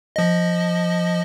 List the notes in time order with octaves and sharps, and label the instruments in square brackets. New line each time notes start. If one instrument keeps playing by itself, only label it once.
[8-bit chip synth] F3 D#5